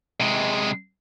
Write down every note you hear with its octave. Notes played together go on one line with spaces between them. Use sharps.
C3 G#3